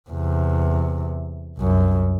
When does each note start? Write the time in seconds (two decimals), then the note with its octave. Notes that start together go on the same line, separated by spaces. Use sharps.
0.10 E2 C3
1.58 C2 F#2